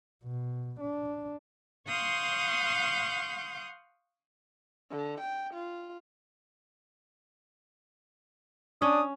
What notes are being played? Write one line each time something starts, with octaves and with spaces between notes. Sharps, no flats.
B2
D4
F5 F#5 C6 C#6 D#6 G6
D3
G5
F4
C#4 D4 D#6